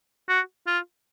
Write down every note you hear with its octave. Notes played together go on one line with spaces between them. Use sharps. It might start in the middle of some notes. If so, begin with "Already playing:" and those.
F#4
F4